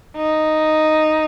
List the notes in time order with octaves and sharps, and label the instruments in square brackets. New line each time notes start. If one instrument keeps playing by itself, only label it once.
[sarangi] D#4